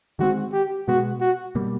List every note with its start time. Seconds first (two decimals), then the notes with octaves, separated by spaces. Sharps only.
0.19 D#3 G#3 C4 F#4
0.53 G4
0.88 B2 G#3 B3 F#4
1.21 F#4
1.55 B2 G3 A#3